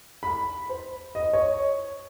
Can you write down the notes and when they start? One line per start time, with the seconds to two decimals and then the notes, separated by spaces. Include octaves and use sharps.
0.23 B5
0.69 C5
1.15 D#5
1.33 C#5